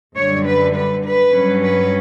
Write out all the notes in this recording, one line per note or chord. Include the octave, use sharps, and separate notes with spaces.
F#2 D3 G3 C#5
B4
B4
B4
G2 F#3 C#4
B4